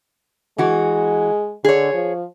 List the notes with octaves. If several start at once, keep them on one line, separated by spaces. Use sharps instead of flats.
E3 G#3 F#4
D3 G#4 C#5
F3